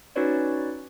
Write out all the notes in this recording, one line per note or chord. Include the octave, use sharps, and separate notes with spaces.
C#4 D#4 F#4 B4 C#5 D5